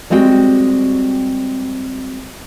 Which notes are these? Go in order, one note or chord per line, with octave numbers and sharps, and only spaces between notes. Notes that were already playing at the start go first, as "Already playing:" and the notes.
G3 G#3 C4 E4 F#4 G5